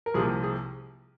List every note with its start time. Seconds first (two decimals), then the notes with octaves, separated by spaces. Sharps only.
0.06 A#4
0.14 C2 C3 F3 A#3 G#4
0.43 G#4